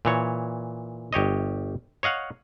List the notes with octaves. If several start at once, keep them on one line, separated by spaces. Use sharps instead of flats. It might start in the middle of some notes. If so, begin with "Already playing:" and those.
A#2 E3 C#5
G1 G4 C#5 D#5
C#5 D#5 F5 F#5